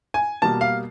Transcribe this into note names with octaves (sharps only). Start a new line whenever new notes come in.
G#5
B2 G3 A#3 A5
F5